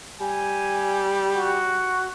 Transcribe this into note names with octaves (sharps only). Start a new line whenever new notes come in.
G3 G#5
F#4